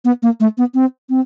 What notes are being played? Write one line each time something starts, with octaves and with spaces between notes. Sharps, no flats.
B3
A#3
A3
B3
C4
C4